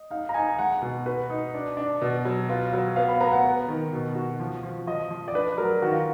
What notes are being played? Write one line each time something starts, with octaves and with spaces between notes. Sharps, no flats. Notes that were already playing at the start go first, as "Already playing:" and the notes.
Already playing: D#5
D#4 F5
A#5
D#4 G#5
G#3 F#5
B2
F#4 B4
D#4
D4
D4
B2 B4
F#3
F4 B4
F#3
B3 F5
B5
B3 A#5
F#5
B3
D#3
B2
F#4
F3
F3
F3 D#5
F3
D5
D4 B4
F#3 A#4
D#3 F#4
F4